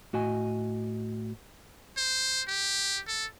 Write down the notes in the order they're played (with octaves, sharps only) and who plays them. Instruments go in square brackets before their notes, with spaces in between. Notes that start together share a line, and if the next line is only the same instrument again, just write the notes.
[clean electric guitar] A2 F#4 D#5 G#5
[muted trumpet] C5
G4
A4